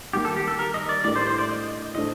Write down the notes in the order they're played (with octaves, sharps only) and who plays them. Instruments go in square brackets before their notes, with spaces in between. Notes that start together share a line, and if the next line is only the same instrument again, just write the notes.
[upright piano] D#3 G3 A#3 [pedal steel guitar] G4
[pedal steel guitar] A4
G4
A4
A#4
D#5
D5
[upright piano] A2 A3 D4 G4 A#4 [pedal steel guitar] D5
[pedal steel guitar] C5
C5
D5
D#5
[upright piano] A2 A3 D4 A4 C5 [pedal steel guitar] D#5